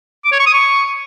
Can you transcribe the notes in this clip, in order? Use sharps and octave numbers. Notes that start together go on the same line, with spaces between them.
D6
C#5
C#6
D#6
C#6